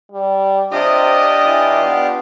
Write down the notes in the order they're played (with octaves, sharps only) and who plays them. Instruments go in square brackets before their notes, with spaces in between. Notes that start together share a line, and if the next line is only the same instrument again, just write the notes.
[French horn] G3
[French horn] C3 [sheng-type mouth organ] D4 F4 G4 [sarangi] D#5
[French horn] E3
B3